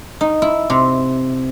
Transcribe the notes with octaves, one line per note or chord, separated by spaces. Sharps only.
D#4
E4
C3